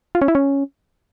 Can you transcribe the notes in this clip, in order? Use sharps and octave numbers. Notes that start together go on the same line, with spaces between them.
F4
C#4
E4
C#4